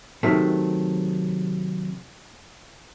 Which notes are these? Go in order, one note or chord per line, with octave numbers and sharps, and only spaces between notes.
C3 D#3 F#3 A3